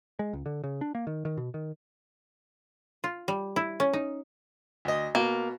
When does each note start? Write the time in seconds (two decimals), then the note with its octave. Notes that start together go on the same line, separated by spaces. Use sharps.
0.19 G#3
0.33 C#2
0.46 D3
0.64 C#3
0.81 D4
0.95 A#3
1.07 D#3
1.25 D#3
1.37 B2
1.54 D#3
3.04 F4
3.28 G3
3.56 E4
3.80 C#4
3.93 D#4
4.85 D2 D#5
5.15 B2 A#3